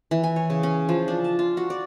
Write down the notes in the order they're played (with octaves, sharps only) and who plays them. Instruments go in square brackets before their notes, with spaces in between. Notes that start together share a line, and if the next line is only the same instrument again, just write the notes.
[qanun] E3
G#5
C#5
C#3
C#4
F3
D4
A5
F4
F#4
D5